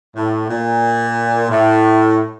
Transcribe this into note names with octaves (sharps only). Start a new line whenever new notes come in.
A2
A#2
A2